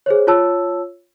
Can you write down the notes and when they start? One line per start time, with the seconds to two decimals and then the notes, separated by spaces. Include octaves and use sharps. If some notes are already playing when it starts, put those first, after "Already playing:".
0.06 G#4 C5 C#5
0.27 F4 C#5 A5 E6